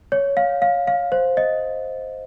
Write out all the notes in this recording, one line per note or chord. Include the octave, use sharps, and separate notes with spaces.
C#5
F5
F5
F5
C5
D#5